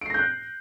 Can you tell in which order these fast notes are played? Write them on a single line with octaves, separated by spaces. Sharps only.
D7 C7 A#6 G6 F#6